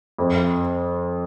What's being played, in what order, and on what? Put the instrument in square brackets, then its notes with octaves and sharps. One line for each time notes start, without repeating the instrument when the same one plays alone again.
[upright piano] F2